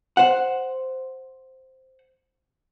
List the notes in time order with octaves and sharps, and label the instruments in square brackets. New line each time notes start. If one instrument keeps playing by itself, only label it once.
[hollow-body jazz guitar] C5 F#5